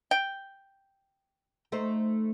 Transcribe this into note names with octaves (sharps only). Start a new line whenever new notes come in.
G5
A3 D#4 C5